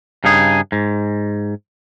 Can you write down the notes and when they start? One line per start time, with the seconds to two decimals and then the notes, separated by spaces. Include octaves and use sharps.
0.24 G2 C#3 D#4 G#4
0.72 G#2